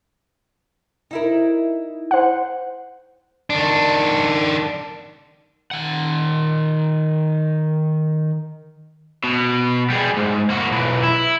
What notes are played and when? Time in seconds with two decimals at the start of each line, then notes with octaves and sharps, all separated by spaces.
1.11 D#4 E4 A#4
2.11 C5 F#5
3.50 D#3 D4
5.71 D#3 F#5
9.24 B2
9.90 G3 G#4
10.17 G#2
10.50 A#3 F#4
10.69 B1 E3
11.03 E4